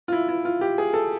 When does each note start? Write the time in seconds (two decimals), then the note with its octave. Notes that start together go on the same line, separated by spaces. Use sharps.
0.08 F4
0.12 E4
0.29 E4
0.45 F4
0.61 G4
0.78 G#4
0.94 A4